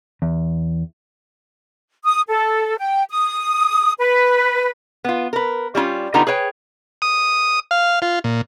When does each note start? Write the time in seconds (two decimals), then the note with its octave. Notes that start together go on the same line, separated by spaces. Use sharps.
0.22 E2
2.05 D#6
2.29 A4
2.79 G5
3.10 D#6
3.99 B4
5.05 B3 F4
5.33 A#4 B4
5.75 G3 C#4 E4 F4
6.14 D3 G3 B3 D#4 F4 A#5
6.27 G#4 B4 C#5 G5
7.02 D#6
7.71 F5
8.02 F4
8.24 A#2